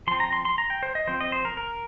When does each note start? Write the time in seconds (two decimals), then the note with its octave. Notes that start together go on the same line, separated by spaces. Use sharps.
0.07 F3 C4 C6
0.20 A#5
0.33 C6
0.45 C6
0.58 A#5
0.70 G5
0.83 C5
0.95 D#5
1.07 F3 C4 C5
1.21 D#5
1.32 C5
1.45 A#4
1.57 A#4